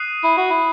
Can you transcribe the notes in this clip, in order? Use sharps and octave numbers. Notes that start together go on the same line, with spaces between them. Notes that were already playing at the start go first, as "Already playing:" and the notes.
Already playing: D#6 F#6 C7 D#7
E4
F#4
E4